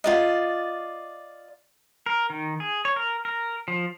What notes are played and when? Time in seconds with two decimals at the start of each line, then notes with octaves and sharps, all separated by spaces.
0.04 F4 D5 D#5
2.06 A#4
2.30 D#3
2.60 G#4
2.85 C#5
2.96 A#4
3.25 A#4
3.68 F3